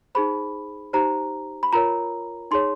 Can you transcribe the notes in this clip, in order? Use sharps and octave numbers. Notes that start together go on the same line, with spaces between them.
D#4 G#4 C5 B5
D#4 G4 C5 A#5
B5
F4 A#4 C#5 A#5
D#4 G#4 C#5 C6